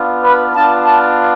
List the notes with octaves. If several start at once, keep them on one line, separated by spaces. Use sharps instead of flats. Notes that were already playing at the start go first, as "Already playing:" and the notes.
Already playing: B3 D4 F4
B4
B3 D4 F4 A5
A5